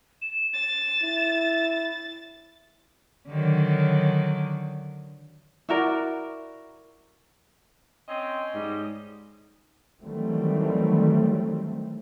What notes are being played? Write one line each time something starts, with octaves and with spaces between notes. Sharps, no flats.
E7
A6 E7
E4
D3 D#3 F#3
E4 F#4 A#4 D5
C4 C#4 D#5
G#2 G3
D#3 E3 F#3 G3 A3 C4